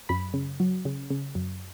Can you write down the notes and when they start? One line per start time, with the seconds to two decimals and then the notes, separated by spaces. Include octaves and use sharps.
0.09 F#2 B5
0.34 C#3
0.60 F#3
0.85 C#3
1.10 C#3
1.35 F#2